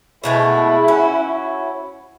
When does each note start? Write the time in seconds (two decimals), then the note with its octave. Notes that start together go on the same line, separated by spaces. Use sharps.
0.24 B2 G#3 A3 E4
0.88 C#4 F#4